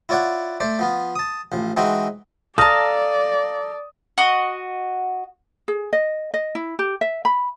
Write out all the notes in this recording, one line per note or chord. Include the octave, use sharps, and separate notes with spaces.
E4 F4 C#5 D5 F#5
A3 C5 D5
F3 B3 F4
A5 D#6
A1 F3
E3 G#3 C4 D#4 F#4
A4 D5 F5 A5 A#5 D#6
F#4 D#5
G#4
D#5
D#5
E4
G4
E5
B5